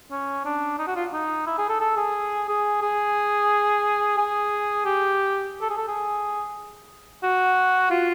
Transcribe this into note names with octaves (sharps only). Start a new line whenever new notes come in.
C#4
D4
D#4
F#4
F4
D#4
E4
G#4
A4
A4
G#4
G#4
G#4
G#4
G4
A4
G#4
A4
G#4
F#4
F4